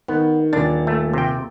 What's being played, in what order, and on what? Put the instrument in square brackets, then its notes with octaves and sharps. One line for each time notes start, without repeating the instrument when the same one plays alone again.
[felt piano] D#3 [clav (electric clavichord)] B3
[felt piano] D#1 A6 [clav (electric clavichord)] D4
[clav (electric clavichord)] A3
C3 G5